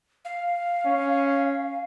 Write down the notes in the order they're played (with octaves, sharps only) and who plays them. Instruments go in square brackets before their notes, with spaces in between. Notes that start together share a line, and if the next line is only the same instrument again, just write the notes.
[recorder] F5
[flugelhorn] C#4